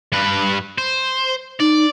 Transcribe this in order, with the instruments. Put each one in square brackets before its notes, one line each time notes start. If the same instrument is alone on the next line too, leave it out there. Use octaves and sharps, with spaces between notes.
[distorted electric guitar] G2 B4
C5
[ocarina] D#4 [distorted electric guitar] D5